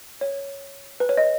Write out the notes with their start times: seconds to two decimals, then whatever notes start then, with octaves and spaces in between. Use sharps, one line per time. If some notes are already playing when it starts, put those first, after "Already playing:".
0.21 C#5
1.00 B4
1.09 C#5
1.17 D#5